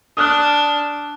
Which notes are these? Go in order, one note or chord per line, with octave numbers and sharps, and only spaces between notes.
D4 D#6 F6 F#6